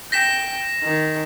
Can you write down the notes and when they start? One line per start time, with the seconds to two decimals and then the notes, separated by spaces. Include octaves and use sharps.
0.12 G5 A#6 B6 E7
0.83 D#3